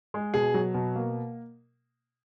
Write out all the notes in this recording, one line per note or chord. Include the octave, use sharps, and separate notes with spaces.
G#3
B2 G#4
F#3
B2
A#3